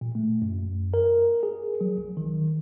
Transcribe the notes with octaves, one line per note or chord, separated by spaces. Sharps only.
A#2
A3
F#2
A#4
G#4
F#3
B1
D#3